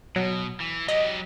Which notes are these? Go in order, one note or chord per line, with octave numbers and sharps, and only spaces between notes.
B2 F#3
E3
F#3 G4 D#5